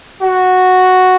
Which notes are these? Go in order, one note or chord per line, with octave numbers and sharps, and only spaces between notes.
F#4